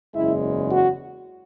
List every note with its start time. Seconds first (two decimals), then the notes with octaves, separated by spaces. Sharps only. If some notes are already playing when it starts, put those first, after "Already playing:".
0.14 F#1 E2 C#3 G#3 E4 E5
0.70 F#4 F#5